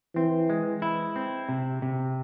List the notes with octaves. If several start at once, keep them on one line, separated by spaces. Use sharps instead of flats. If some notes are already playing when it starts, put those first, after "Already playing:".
E3 C4
G#3
E4
C4
C3
C3